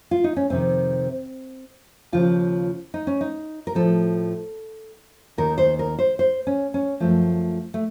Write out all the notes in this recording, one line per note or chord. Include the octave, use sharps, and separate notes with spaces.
F4
D#4
C#4
F2 C3 D#3 C4
D#2 C#3 F3 F4
D#4
C#4
D#4
A#4
A2 F3 A4
D#2 D#3 A#4
C5
A#4
C5
C5
C#4
C#4
F#2 F3 A3
A3